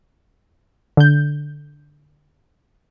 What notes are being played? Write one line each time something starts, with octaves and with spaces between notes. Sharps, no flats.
D3 G6